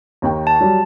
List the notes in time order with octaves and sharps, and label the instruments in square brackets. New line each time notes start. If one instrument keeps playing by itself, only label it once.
[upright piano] D#2 D#3 G5
[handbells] A5
[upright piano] F#3 G3